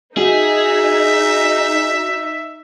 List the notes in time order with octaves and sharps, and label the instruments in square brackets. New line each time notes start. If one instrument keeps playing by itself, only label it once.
[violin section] D#4 [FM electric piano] F#4 [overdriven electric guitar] G#4 [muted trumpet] E5